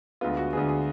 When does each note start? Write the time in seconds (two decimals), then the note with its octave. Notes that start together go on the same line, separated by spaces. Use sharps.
0.21 D2 D3 G#3 B3 F4
0.37 F#4
0.53 D2 D3 G#3 B3 G#4
0.69 G#4